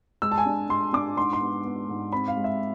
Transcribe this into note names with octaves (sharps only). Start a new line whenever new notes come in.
G#3 E6
A5
G#5
D4
G#3 C6
D4 D6
G#2 C6
C6
B3
B3
G#2
C4 B5
F5
G#3
E5